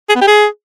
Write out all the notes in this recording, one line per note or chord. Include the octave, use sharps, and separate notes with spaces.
G#4
B3
G4
G#4